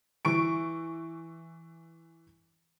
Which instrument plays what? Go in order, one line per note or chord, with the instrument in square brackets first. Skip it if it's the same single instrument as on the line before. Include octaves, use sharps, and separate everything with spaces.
[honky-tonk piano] E3 C#6 D7